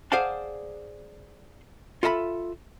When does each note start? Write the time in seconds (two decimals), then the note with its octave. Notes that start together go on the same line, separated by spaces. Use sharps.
0.12 G#4 C5 D5 F5 F#5 A5
2.03 F4 A4 E5 A#5 B5